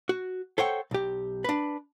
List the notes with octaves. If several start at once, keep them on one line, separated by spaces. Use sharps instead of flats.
F#4
A4 C5 C#5 F#5 G5
B1 G4
D4 B4